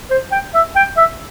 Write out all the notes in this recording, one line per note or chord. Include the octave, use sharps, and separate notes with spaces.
C5
G5
E5
G5
E5